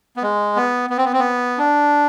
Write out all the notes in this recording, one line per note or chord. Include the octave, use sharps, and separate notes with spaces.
B3
G#3
B3
B3
C4
B3
C4
B3
D4